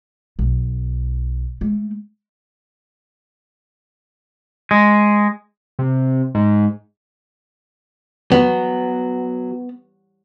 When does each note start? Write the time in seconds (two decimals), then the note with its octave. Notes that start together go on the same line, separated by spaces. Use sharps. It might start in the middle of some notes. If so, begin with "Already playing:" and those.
0.39 B1
1.61 G#3 A3
4.71 G#3
5.79 C3
6.35 G#2
8.32 F#3 B3